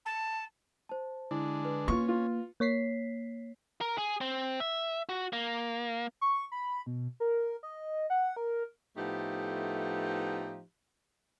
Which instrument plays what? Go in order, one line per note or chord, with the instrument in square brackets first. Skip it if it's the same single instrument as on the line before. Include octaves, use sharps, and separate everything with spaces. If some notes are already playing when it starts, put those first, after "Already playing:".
[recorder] A5
[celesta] C5 A5
[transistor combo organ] D3 G#3 D4 [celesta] E4
[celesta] B4
[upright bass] A#3 [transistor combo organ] C#4 [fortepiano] F4 C#6
[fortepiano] F4
[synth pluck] A#3 C#5 B6 C7
[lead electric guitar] A#4
G#4
C4
E5
F#4
A#3
[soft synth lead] C#6
B5
B2
A#4
D#5
F#5
A#4
[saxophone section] A2 F3 A3 B3 D#4 G4